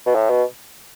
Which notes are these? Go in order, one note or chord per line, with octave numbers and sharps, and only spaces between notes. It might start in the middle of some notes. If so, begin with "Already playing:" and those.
B2
A2
B2